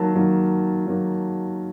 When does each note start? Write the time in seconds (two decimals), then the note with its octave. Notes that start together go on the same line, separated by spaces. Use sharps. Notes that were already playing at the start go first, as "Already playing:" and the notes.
Already playing: D#3 F#3 A#3 A5
0.15 D#3 F#3 A#3
0.86 D#3 F#3 A#3